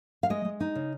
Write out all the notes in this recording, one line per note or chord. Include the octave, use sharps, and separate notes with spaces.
F5
G#3 D#5
G#3
D#4
C#3